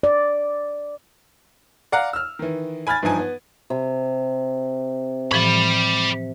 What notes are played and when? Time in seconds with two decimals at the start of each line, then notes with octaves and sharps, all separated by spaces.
0.03 D5
1.92 D5 F5 F#5 A#5
2.13 E6 F6
2.39 D#3 E3
2.87 G#5 B5 F6 G#6 A6
3.03 G2 E3 F3 D#4 G#5
3.19 B3
3.70 C3
5.31 A2 E3 F3 G4 B5